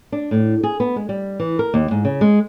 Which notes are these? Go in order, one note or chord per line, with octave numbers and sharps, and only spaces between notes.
D4
A2
G#4
B3
G#3
G3
E3
A#4
D#2
G#2
C#3
G#3